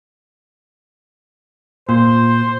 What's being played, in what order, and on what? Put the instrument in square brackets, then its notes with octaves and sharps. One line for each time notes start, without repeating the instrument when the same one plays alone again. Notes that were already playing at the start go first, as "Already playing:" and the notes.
[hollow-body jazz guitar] A#2 [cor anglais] C5